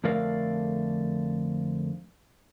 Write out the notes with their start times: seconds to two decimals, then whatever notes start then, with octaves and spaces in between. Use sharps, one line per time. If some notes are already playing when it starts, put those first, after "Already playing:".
0.04 F2 D3 A3 A#4 D5 F5